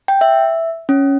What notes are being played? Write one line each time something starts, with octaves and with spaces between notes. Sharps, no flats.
G5
E5
C#4